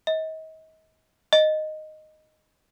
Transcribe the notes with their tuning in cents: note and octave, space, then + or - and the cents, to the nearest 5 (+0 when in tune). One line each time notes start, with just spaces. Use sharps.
D#5 +35
D#5 -5